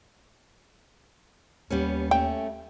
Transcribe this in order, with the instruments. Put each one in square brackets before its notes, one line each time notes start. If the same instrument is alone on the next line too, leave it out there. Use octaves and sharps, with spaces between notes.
[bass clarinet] D#2 [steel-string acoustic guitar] G3 B3 C#4
[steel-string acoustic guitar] A3 C#4 [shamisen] G5